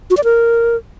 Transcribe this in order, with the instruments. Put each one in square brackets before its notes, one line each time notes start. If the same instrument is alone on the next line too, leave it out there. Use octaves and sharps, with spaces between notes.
[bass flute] F#4
D5
A#4